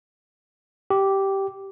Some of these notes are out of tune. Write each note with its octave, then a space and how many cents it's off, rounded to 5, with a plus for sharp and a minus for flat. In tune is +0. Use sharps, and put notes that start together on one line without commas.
G4 -10